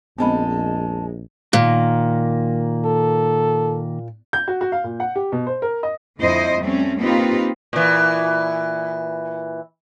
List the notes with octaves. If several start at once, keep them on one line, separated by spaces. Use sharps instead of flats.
A#1 F2 G#3 B3 C4 D#4 A5 B5
A#2 D#3 A#3
A4
G6
F#4
F#4
F5
A#2
F#5
G4
B2
C5
A#4
D#5
F2 D3 E4 C5 D#5
G3 A3 C4 C#4
A#3 C4 D#4 F4 G4 B4
A#2 E3